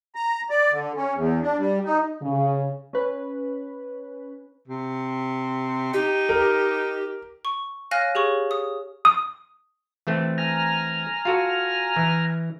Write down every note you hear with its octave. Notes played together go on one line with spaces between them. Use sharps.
A#5
D5
D3
C#4
E2
D4
G3
D#4
C#3
C#4 B4
C3
D#4 G4
A#4
C#6
C#5 F5 G#5 F6 F#6 A#6
G4 G#4 C#5 C#6
D#6
D#6
E3 A3 C4
G#5 A#5 F6
F4 F#4 A4
E3